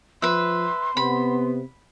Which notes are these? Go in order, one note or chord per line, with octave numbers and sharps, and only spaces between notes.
F3 B4 E5 C6
C3 B3 B5